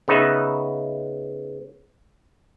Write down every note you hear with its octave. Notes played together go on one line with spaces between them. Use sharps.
C#3 B3 D#4 B4 E5